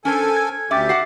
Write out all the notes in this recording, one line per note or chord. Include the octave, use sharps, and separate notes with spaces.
C#4 A4 A#4 C5 G#5
G#6
D2 C#4 G4 E5 D6 A6
F#4 F#5 C7